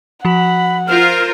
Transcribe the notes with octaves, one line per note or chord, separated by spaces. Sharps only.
F3 F#4 F#5 B5
F4 A#4 C5 F6